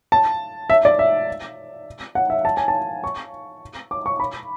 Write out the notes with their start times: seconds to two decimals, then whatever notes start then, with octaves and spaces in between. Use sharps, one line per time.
0.12 A5
0.70 E5
0.85 D5
0.99 E5
2.15 F#5
2.30 E5
2.45 A5
2.57 G#5
2.68 A5
3.04 C#6
3.91 D6
4.06 C#6
4.20 B5